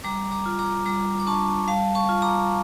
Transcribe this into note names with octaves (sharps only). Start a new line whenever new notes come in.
G3 A#5 D6
A#5 D6
F4
A#5 D6
G3 A#5 D6
D6
D4 A5 C#6
G3 F5 A5
A5 C#6
F4
A#5 D6